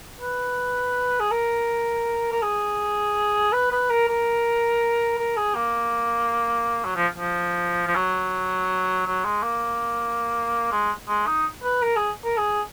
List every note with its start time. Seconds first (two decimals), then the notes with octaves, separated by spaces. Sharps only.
0.21 B4
1.20 G#4
1.31 A#4
2.32 A#4
2.42 G#4
3.53 B4
3.72 B4
3.90 A#4
4.09 A#4
5.19 A#4
5.37 G#4
5.55 A#3
6.85 F#3
6.96 F3
7.18 F3
7.88 F3
7.95 F#3
9.06 F#3
9.25 G#3
9.43 A#3
10.72 G#3
11.08 G#3
11.27 D#4
11.64 B4
11.83 A#4
11.96 G#4
12.24 A#4
12.37 G#4